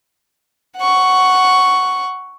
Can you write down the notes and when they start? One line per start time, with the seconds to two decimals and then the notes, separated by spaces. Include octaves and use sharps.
0.77 F#5 C#6